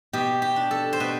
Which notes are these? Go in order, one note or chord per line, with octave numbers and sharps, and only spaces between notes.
B2 G4
G4
D4
A4
C5
B2 B4